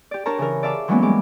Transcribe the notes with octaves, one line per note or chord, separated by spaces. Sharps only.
G4 D5
D4 G4 A#4 C#5 A5 A#5
C#3 E3 A#4
D5 E5 F5 A5 D6
E3 F#3 G#3 A#3 B3 C#4
G#2 G3 G#3 D6